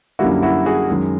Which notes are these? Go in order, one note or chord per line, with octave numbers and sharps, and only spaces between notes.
F#2 D3 G3 A#3 E4 F#4
E4 F#4
F#4 G#4
F#2 D#3 G#3